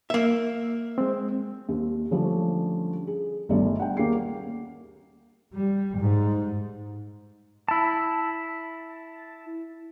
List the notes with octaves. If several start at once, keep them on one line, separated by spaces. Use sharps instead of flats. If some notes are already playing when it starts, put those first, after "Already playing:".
A#3 E5
G#3 C4
D#2
D3 F3 G3 A3 C#4
G#4
G1 D2 G2 B2 D#3 D5
F#5 G5
D#2 A#3 C#4 G#4 C7
G3
G#2
E4 A5